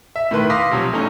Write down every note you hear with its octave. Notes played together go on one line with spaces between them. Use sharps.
E5
A2 D#3 B4 C6
F5 C6 D6 D#6 A#6 B6
C3 F3 F#3
E2 A3 C#4 D#4